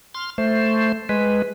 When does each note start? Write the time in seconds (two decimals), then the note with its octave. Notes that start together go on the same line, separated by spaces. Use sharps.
0.14 C6 F6
0.38 A3 C5
1.09 G#3 B4